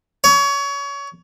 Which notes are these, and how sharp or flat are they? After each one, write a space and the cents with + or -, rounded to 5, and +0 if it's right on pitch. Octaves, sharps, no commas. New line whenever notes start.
C#5 +25